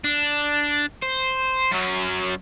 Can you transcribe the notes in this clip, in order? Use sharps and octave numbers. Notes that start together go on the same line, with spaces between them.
D4
C5
F#2 F#3